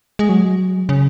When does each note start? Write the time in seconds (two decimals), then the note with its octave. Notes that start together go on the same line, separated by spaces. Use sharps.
0.19 G#3
0.29 F#3
0.89 C#3